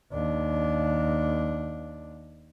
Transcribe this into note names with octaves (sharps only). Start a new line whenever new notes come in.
D#2 D4